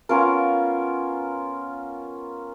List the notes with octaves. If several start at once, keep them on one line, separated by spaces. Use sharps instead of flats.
B3 C#4 F4 A#4